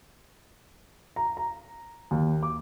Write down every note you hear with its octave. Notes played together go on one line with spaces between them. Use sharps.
A#5
A#5
D#2
D6